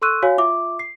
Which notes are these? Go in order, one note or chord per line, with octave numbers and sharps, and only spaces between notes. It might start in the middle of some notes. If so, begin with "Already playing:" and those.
A4 C6 C#6 E6 F#6 D#7
F#4 C#5 F5 G#5
F4 E5 D6
C7